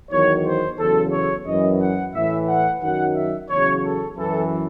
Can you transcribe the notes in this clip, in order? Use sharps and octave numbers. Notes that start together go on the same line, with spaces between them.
E2 D#3 F#3 C#5
C5
E2 C#3 F#3 A4
C#5
F#2 E3 D#5
F#5
A2 E3 E5
F#5
F#2 D#3 F#3 F#5
E5
E2 C#3 F#3 C#5
A4
F#2 E3 A4